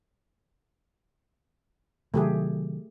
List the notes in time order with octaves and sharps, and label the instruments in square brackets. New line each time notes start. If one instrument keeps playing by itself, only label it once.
[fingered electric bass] C3 D#3 F#3 [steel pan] A3 G4 G#4